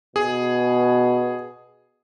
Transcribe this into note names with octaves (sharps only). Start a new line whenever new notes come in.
B2 G#4